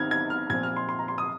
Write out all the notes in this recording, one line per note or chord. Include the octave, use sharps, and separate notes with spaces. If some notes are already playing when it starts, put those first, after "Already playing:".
Already playing: D#3 C4 D#4 F6 G#6
G#6
F6
A#2 F3 C4 G#6
F6
C6
C6
A#5
C6
D#6